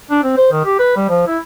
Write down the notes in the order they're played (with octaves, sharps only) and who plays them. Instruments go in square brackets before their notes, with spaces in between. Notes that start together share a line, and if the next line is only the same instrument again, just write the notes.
[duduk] D4
C4
C5
D#3
G4
B4
G3
F3
E4